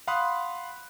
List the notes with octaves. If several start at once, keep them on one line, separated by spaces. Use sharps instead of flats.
F5 F#5 B5 C6 D#6 F#6